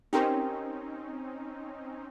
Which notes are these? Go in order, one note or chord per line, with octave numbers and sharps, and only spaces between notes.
C4 C#4 D#4 G4 A#4 C5